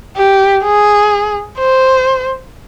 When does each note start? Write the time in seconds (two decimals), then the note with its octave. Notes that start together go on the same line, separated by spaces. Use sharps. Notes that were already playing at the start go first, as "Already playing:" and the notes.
0.17 G4
0.64 G#4
1.58 C5